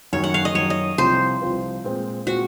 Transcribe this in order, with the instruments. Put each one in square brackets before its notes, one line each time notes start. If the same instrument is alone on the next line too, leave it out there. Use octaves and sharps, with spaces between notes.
[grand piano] F#2 D#3 F#3 [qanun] C#5
[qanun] F#5
F5
D#5
[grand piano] F#2 D#3 F#3 [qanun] C#5
[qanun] D#5
[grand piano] C2 C3 F3 C4 F4 [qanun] C5
[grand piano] C2 C3 F3 C4 F4
A#2 G#3 C4
[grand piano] A#2 G#3 C4 [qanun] F#4